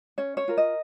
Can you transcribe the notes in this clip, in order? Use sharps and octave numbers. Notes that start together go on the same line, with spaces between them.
C#4 C#5
C#5
F4 A#4
D#5